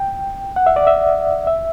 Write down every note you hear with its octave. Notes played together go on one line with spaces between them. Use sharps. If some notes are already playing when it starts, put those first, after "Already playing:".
Already playing: G5
F#5
E5
D5
E5
E5